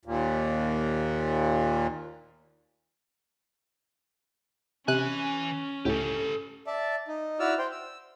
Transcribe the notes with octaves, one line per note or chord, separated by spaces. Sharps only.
D#2 A#2
C3 E3 C#4 G#5 F#6
C#2 A2 G4 A4
D5 E5 A5
D#4
E4 F#4 D5 E6 F6
C5 G5
E6